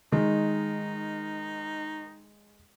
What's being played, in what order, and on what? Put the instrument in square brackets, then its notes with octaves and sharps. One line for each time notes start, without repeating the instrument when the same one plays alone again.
[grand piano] D#3 [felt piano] G#3 [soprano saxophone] D#4